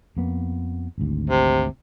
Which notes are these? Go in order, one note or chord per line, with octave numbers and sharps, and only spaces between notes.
F2 A#3 B3
G#1 D2
C3